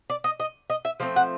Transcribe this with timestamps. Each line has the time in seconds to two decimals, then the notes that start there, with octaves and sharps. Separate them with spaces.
0.10 D5
0.24 D#5
0.40 D#5
0.70 D#5
0.85 E5
1.00 F3 A3 C4 F5
1.16 F#5